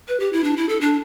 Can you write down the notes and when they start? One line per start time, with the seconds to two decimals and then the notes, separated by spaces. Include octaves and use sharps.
0.08 B4
0.20 G4
0.33 E4
0.44 D4
0.57 E4
0.69 A4
0.81 D4